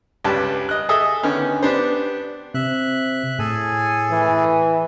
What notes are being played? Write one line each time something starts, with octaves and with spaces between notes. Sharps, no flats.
C#2 G2 G3 B4 A5
D#5 F#6
G#4 A4 D#5 E5 D#6
D3 D#3 B3 C#4
B3 D4 G4 C5
C3 E5 F#6
A2 G#4 A4 G#5
E3